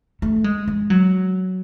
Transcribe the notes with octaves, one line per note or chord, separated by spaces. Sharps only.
A3
G#3
G#3
F#3